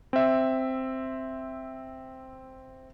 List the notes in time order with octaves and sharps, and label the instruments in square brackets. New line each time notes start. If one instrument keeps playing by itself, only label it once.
[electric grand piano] C4 E5